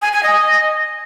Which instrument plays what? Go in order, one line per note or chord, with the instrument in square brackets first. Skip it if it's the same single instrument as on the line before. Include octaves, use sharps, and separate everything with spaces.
[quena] G#5
G#5
D#5